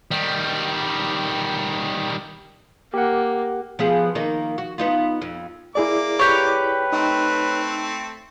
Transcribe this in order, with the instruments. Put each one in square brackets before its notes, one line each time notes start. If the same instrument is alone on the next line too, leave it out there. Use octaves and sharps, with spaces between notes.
[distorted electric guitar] D#3 G3
[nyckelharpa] A#3 [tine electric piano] G4 F#5
[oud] F3 B3 G#4
D#3 A#3 D#4
F#4
B3 D#4 F4
F2
[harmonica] A#3 D6 [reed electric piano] E4 G#4 D5
[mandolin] G4 C#5 [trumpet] B4
[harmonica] A3 C4 [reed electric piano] D#4